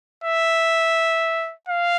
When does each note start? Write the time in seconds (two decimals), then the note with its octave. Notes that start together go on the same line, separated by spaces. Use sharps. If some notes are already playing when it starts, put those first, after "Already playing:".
0.24 E5
1.68 F5